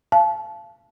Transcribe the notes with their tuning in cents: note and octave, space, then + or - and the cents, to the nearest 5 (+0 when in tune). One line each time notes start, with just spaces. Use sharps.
F5 -25 A5 -25